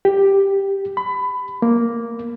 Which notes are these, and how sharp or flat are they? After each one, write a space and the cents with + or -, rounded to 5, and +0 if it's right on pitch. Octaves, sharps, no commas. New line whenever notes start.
G4 +5
B5 +20
A#3 +0